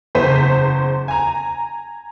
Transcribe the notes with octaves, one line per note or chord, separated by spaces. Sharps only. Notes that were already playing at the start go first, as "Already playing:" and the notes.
F#1 E2 C5 B6 D#7
G#5 A#5